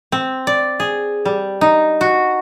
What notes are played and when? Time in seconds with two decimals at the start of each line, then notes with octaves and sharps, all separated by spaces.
0.12 C4
0.47 D5
0.80 G#4
1.25 G3
1.61 D#4
2.01 F#4